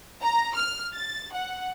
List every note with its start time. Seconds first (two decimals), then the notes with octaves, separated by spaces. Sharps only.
0.22 A#5
0.56 F6
0.94 A6
1.33 F#5